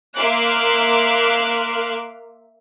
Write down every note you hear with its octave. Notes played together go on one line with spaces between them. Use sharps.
A#3 E5 C6 D6 F6 F#6